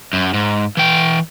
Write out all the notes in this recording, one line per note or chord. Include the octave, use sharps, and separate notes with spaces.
F#2
G#2
E3 G5